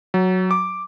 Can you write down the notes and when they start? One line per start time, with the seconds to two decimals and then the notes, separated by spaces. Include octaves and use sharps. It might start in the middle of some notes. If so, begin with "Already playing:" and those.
0.14 F#3
0.51 D6